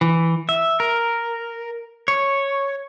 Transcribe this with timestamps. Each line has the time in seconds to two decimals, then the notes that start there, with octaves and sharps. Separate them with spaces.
0.01 E3
0.49 E5
0.80 A#4
2.08 C#5